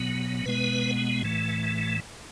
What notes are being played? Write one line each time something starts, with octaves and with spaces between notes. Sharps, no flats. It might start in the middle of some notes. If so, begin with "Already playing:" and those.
Already playing: B2 F#3 B3
B2 G#3 B3 B4
A2 E3 A3